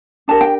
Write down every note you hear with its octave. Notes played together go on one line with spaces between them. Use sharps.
D4 G4 A#4 A5
G5